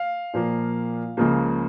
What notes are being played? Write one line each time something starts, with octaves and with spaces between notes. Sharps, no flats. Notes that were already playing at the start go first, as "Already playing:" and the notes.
Already playing: F5
A#2 F3 A#3
C#2 C#3 F3 A#3